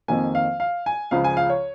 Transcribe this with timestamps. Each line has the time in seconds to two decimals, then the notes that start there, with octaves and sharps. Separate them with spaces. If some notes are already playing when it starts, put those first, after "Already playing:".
0.08 F2 D#3 A#3 G#5
0.35 F5
0.60 F5
0.86 G#5
1.11 C#2 C#3 F3 F5
1.24 G#5
1.37 F5
1.49 C#5